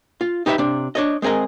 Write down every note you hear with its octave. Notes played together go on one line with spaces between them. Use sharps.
F4
D#4 G4 B4 D5 E5 B5
C3 D4
D4 C#5 D#5
G#3 C4 G#4 A#4 D#5